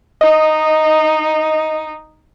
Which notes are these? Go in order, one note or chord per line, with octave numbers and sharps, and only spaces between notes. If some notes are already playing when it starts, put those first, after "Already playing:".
D#4 D#5